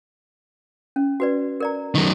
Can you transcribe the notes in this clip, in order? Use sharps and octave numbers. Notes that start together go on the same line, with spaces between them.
C#4
F#4 B4 D5
A#4 D5 A#5
F#2 D#3